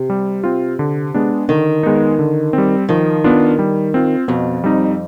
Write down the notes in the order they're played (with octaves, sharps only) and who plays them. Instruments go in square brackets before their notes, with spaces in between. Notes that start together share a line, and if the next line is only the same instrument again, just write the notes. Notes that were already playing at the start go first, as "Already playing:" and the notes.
Already playing: [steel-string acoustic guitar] C3
[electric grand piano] G3
C4 F4
D3
G#3 B3 D4
[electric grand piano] D3 [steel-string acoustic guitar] D#3
[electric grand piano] G#3 B3 D#4
D3
G3 C4
[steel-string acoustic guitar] D#3 [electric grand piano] F3
[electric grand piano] B3 D4 F4
G3
C4 F4
[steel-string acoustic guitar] F2 [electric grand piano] B2
[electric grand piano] G3 C4 D#4